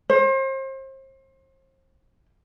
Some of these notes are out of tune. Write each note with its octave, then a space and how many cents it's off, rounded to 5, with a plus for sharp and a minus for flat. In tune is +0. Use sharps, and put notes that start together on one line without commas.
C5 +35